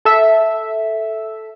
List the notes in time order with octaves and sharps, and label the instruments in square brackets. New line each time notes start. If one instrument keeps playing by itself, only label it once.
[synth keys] A4 E5